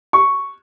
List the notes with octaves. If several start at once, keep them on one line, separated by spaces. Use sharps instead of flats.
C#6